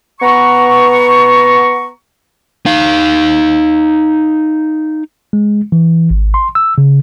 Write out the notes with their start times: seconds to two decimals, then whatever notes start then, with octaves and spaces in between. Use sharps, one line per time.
0.21 B3 A#5 C#6
2.66 D#4 F5
5.33 G#3
5.72 E3
6.11 G#1
6.34 C6
6.55 E6
6.78 C#3